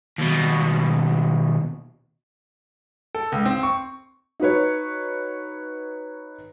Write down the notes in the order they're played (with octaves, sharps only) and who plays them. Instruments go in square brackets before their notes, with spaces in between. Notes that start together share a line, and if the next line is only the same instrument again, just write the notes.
[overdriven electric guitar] D#2 B2
[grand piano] A4
C#2
C4
C#6
[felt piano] D#4 F#4 B4 C#5